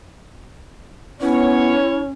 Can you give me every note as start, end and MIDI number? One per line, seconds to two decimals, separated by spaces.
1.21 1.78 59
1.21 2.11 61
1.21 1.99 64
1.21 2.10 73